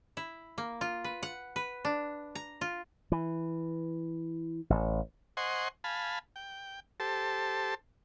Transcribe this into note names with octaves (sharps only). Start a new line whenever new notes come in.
E4
A#3
F4
B4
F#5
B4
D4
A#5
F4
E3
A1
C5 D#5 F#5 G#5 C6 C#6
F5 G#5 A5 B5
G5
G4 A4 C5 A5